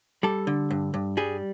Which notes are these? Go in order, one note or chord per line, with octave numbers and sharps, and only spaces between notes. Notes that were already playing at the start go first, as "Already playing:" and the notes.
G3 A4
D3
G2
G2
G3 G#4